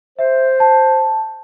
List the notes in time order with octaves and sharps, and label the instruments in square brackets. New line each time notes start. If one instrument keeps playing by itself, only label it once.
[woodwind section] C5 [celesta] E5
[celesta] A5